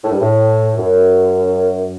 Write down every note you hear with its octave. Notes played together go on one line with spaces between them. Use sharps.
A2
G2
A2
F#2